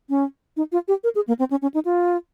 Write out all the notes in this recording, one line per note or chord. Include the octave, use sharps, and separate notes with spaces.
C#4
D#4
F4
G4
A#4
G#4
A#3
C4
C#4
C#4
D#4
F4